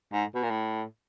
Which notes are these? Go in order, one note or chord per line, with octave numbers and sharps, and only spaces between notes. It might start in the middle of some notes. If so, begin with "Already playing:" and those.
G#2
B2
A#2
A2